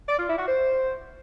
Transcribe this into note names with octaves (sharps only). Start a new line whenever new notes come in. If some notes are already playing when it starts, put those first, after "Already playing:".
D5
F4
E4
F#4
C5